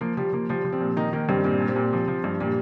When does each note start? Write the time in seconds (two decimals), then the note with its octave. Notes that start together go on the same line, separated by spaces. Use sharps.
0.01 F3 A#3
0.17 F3 G3
0.33 F3 A#3
0.49 F3 G3
0.65 F3
0.72 G3 C4
0.80 A#2
0.96 D#3 A#3 D#4
1.13 D#3 A#3
1.28 G2 G3 C4
1.44 A#2 G3 C4
1.60 A#2
1.68 G3 C4
1.76 A#2
1.93 F3
2.08 F3
2.24 G2
2.40 A#2 G3